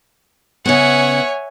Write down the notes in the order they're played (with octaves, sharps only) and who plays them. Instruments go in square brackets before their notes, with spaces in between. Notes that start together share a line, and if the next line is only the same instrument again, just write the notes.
[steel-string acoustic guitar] C#3 B3 [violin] C#5 G#5 [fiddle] E5 F#5